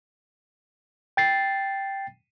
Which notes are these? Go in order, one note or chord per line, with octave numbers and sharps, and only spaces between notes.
G5 A6 C7